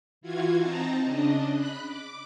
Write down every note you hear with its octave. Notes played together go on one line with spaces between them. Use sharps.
E3 F4 F#4 G#6
C4 D#4 A5 A#5
C#3 D4 D#5
B5 F#6
D6